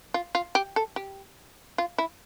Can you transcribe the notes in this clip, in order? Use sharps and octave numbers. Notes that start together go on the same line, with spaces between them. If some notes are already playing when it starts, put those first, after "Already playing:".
F4
F4
G4
A4
G4
F4
E4